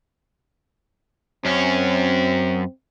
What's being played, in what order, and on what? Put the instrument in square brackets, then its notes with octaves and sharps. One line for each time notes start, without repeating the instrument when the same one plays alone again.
[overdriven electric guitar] F#2 C#4 [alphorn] C4